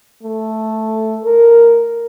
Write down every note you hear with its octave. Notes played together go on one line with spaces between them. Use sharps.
A3
A#4